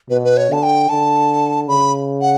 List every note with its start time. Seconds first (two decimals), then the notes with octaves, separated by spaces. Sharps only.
0.10 B2 B4
0.24 B4
0.37 C#5
0.50 D3 A5
0.63 G5
0.89 D3 A5
1.68 C#3 B5
2.21 F#5